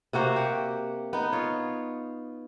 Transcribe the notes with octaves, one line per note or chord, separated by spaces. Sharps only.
C3 A#3 F#4 C5
G4 F#5
B3 D#4
F4 C#5